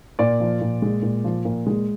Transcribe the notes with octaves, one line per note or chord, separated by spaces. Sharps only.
A#2 D5
F3
A#2
G#3
A#2
F3
A#2
G#3